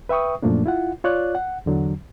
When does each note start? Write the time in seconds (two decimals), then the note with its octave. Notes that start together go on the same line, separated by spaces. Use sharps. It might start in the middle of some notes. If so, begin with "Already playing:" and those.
0.09 B4 E5 G5 C#6 D#6
0.42 F#2 A#2 F3 A3 A#3 D4
0.66 E4 F4 F#5
1.04 F4 C#5 D5 F#6
1.35 F#5
1.66 E2 D3 F#3